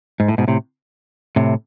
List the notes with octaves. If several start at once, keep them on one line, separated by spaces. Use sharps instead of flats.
G#2
A2
G#2 B2
A2 C3
A2 C3